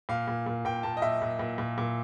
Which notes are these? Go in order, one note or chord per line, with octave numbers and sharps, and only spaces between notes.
A#2 F5
A#2
A#2
A#2 G5
A#2 A5
D#5
A#2 E5
A#2
A#2
A#2
A#2